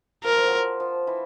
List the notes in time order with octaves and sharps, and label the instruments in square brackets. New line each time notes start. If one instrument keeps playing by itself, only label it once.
[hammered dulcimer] F3 [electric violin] A#4
[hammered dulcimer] F#3
F3
F3
E3